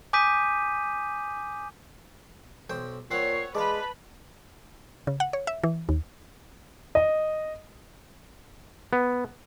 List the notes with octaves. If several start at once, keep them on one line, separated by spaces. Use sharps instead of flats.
G#5 D6 D#6 G6 B6 D#7
B1 C5 G5
A#2 C4 C#5 F#5 C7
G#3 B4 D5 F5 A5 B5
C#3
F#5
C#5
E5
E3
D#2
D#5
B3